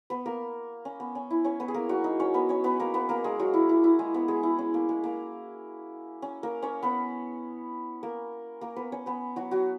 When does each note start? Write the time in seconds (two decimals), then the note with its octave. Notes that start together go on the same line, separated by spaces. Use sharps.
0.10 B3 B4
0.26 A#3 A#4
0.85 C#4
1.00 B3
1.15 C#4
1.31 E4
1.44 C#4 C#5
1.60 B3 B4
1.68 G#4
1.74 A#3 A#4
1.89 F#3 F#4
2.04 D#4
2.20 C#4 C#5
2.34 B3 B4
2.49 C#4 C#5
2.64 B3 B4
2.80 A#3 A#4
2.94 B3 B4
3.09 A#3 A#4
3.24 G#3 G#4
3.39 F#3 F#4
3.54 E4
3.69 E4
3.84 E4
3.99 G#3 G#4
4.14 B3 B4
4.28 G#3 G#4
4.43 E4
4.59 C#4
4.74 A#3
4.89 G#3
5.04 A#3
6.22 C#4
6.43 A#3 A#4
6.62 C#4 C#5
6.83 B3 B4
8.03 A#3 A#4
8.61 A#3 A#4
8.76 B3 B4
8.92 C#4 C#5
9.06 B3 B4
9.36 F#3 F#4
9.51 F#3 F#4